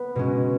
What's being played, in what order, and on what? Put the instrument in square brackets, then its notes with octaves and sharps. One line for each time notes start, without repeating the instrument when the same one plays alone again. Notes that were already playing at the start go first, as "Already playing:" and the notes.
Already playing: [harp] B3
B2 G#3 C#4